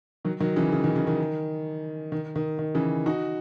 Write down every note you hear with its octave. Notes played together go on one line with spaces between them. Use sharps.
D#3 F#3
D#3 F#3
C#3 E3
C#3
D#3
C#3
D#3
D#3
D#3
D#3
C#3 E3
D#4 F#4